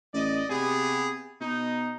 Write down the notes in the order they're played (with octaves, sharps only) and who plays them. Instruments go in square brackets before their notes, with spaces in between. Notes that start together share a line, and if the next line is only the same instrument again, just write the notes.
[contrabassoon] A1 [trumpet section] D5 D#5
[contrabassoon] C3 [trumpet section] B3 G4 G#4
[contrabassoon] B2 [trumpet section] D#4